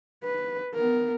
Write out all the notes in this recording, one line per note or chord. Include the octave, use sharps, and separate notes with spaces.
B4
B3 A#4